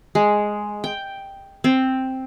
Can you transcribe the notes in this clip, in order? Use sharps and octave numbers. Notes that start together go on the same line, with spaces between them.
G#3
G5
C4